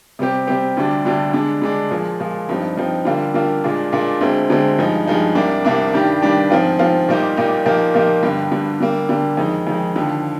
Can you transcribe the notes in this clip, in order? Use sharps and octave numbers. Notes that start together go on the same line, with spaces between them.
C3 G3 C4 G4
C3 G3 C4 G4
D2 D3 G3 D4
D2 D3 G3 D4
D3 G#3 D4
D3 G#3 D4
A#2 F3 G#3
A#2 F3 G#3
G2 F3 C4 D#4
G2 F3 C4 D#4
D3 G3 A#3 F4
D3 G3 A#3 F4
A#2 G#3 D4 F4
A#2 G#3 D4 F4
D2 D3 G#3 C4
D2 D3 G#3 C4
G2 F3 G#3 D#4
G2 F3 G#3 D#4
C2 C3 G3 A#3 D4
C2 C3 G3 A#3 D4
G2 D#3 G3 D4 G4
G2 D#3 G3 D4 G4
G#2 F3 C4 F4
G#2 F3 C4 F4
A#2 G3 A#3 D#4 G4
A#2 G3 A#3 D#4 G4
A#2 F3 A#3 D#4 G4
A#2 F3 A#3 D#4 G4
G2 D3 G3
G2 D3 G3
D3 G3 A#3
D3 G3 A#3
F2 D#3 G#3 D#4
F2 D#3 G#3 D#4
D#2 D3 F3